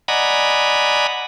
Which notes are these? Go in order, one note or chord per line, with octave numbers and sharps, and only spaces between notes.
D5 D#5 F#5 G#5 A#5 B5